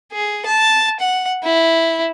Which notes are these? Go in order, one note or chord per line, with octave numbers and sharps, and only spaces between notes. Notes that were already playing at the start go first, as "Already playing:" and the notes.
G#4
A5
F#5
E4